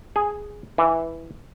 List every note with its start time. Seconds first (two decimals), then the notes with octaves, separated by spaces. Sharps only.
0.16 G#4
0.78 E3